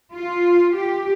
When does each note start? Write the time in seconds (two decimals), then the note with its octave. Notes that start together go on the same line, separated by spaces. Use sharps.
0.15 F4
0.77 G4